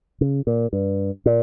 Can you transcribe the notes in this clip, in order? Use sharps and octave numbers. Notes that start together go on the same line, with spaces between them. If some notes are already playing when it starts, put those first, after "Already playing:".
C#3
A#2
G2
A#2